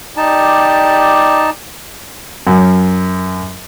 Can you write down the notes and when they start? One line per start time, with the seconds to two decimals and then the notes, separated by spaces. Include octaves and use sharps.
0.17 D#4 G4 D5 A5
2.47 F#2